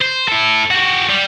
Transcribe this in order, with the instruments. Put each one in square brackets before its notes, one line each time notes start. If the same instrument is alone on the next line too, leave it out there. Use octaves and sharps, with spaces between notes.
[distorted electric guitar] C5
E4 A4
F#4 G4
G3